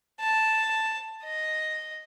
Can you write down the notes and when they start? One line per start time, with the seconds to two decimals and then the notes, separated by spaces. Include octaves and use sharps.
0.20 A5
1.23 D#5